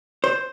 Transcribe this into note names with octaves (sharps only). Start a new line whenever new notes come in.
C5